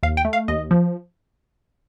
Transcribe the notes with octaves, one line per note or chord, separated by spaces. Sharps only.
D#2 F5
G5
A3
F5
D#2 D#5
F3